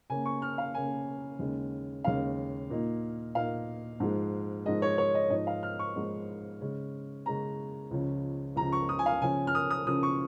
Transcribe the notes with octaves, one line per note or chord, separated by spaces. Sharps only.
C#3 A#3 C#4 G#5
C#6
F6
F5
C#3 A#3 C#4 G#5
D#2 C#3 G#3 C#4
D#2 C#3 G#3 C#4 F5
A#2 A#3 D#4
A#2 A#3 D#4 F5
G#2 F3 G#3
G#2 F3 G#3 D#5
C#5
C#5
D#5
G#2 F3 G#3 D#4 D#5
F5
F6
C#6
G#2 F3 G#3 D#4
C#3 G#3 C#4
C#3 G#3 C#4 A#5
C#2 C#3 F3 C#4
C#2 C#3 F3 C#4 A#5
C#6
D#6
G#5
F5
C#3 F3 C#4 G#5
F6
D#6
D#6
C#3 F3 C#4 D#6
C#6